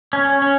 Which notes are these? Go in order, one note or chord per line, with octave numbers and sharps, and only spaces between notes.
C#4
C#4